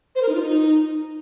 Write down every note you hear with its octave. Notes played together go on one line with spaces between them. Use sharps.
C5
A#4
D#4
F4
D#4